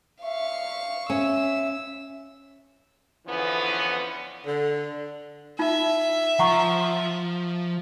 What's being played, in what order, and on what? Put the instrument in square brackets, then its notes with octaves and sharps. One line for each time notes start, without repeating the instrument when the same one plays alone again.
[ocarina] E5 [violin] F5 C#6
[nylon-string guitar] C#4 [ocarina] E5 [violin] E6
[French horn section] E2 D3 E3 F3 B3 C#4
[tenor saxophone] D3
[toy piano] D#4 F4 [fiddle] E5
[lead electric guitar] F3 [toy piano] F#5 A#5 C#6